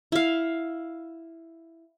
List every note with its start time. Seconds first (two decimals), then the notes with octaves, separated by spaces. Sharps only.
0.12 E4 F5